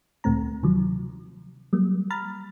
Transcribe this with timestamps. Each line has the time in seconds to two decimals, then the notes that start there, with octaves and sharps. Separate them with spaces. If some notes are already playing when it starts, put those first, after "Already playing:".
0.24 D2 A#2 A3 C4 A#5
0.63 C3 D#3 F3 F#3
1.73 F#3 G3 A#3
2.11 A#5 B5 F6 A6